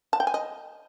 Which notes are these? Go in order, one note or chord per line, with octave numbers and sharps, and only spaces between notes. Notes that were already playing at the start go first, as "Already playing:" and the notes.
A5
G5
G#5
D#5